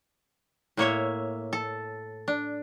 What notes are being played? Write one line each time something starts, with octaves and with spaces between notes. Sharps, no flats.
A2 A#3 C#5 E5
A4
D4